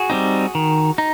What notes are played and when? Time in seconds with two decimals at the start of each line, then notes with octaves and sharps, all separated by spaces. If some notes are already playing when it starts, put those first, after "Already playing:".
Already playing: F#4 G#4
0.10 G3 C4 D#4
0.55 D#3
0.98 D#4